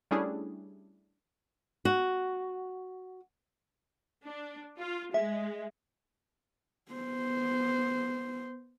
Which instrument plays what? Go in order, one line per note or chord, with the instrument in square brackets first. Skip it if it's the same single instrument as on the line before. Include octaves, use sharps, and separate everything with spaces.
[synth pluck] G3 A3 C#4 D4 E4 G#4
[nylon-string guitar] F#4
[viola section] D4
F4
[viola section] G#3 [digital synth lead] E5
[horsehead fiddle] B3 C5